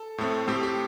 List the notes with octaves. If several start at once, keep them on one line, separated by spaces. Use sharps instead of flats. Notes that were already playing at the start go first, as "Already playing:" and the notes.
Already playing: A4
A2 A3 C4
A2 A3 C4 G4
G4